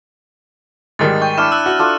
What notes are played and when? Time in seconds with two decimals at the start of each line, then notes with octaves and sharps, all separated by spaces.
0.99 G#2 D#3 G3 A6
1.22 G5 C#6
1.38 D4 E4 C#6 F6 E7
1.52 E6 F#6
1.66 F#4
1.79 D4 F4 A4